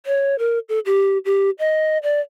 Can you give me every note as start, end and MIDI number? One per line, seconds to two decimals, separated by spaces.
0.06 0.35 73
0.39 0.59 70
0.69 0.79 69
0.86 1.18 67
1.25 1.50 67
1.59 1.98 75
2.03 2.20 74